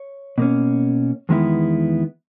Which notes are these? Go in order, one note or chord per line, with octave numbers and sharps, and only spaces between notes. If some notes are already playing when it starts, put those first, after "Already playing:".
Already playing: C#5
B2 A#3 C#4
E2 D#3 G#3 B3 E4